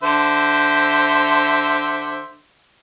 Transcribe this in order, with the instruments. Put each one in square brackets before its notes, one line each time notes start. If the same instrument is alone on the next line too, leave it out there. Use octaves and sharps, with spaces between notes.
[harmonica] D3 C5 E5